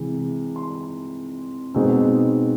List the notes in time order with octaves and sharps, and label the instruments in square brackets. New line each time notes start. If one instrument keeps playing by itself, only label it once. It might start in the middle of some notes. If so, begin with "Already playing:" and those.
Already playing: [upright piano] C3 E3 G#3
C6
B2 G#3 C4 D#4